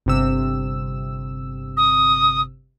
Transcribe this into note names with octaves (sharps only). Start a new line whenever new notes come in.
G1 C3 E6
D#6